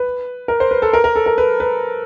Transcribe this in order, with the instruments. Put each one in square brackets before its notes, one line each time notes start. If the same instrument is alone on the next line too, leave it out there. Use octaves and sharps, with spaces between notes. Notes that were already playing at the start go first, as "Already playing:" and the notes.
Already playing: [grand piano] B4
A#4
C5
B4
A4
A#4
A#4
A4
A#4
B4
B4